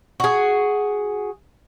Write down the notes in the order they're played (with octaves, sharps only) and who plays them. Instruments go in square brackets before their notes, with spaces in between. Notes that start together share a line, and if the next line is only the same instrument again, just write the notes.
[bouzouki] F#4 G#4